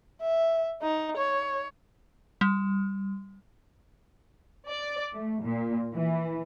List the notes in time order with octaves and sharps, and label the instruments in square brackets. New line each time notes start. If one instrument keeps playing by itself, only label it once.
[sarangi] E5
D#4
C#5
[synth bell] G3
[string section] D5
A3
A#2
E3